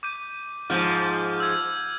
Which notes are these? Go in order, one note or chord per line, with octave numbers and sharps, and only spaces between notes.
D6 G6 D#7
G#2 F3 F6 G6
E6 G#6